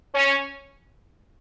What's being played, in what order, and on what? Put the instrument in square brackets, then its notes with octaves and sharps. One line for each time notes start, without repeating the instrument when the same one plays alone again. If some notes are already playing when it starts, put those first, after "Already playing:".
[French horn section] C#4